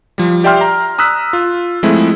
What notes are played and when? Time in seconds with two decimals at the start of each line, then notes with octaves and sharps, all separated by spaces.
0.18 F3 G3
0.44 G4 D5 E5 G5 C6 F6
0.61 A#5
0.98 A#5 D#6 E6 F#6 B6
1.33 F4
1.83 F3 G#3 A3 C4 E4